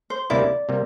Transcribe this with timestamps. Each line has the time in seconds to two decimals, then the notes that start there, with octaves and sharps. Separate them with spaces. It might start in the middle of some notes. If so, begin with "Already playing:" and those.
0.10 C5
0.30 D2 C3 G3 A#3 E4 D5
0.69 C3 G3 A#3